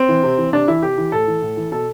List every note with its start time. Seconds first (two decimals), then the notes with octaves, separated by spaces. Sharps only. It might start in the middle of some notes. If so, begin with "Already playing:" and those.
Already playing: C4
0.09 E3
0.23 C3
0.38 E3
0.53 C3 D4
0.68 E3 E4
0.82 C3 G4
0.98 E3
1.12 A2 A4
1.27 E3
1.42 A2
1.57 E3
1.72 B2 A4